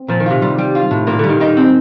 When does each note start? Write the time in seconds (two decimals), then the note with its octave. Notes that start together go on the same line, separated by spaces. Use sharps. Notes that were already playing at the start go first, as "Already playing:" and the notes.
Already playing: C4
0.08 A#2 F3
0.20 D#3
0.26 C3 F4
0.42 G3
0.58 G3
0.75 F4
0.91 A2
1.07 A#2 A#3
1.19 D3 G3
1.29 D#3
1.40 D#3 D#4
1.57 C4